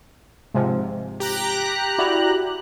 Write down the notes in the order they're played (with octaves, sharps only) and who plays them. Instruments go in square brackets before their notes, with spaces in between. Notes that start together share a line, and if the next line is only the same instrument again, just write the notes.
[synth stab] G#2 C3 F3
[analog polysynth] G4 A#5 F#6
[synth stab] E4 F#4 D5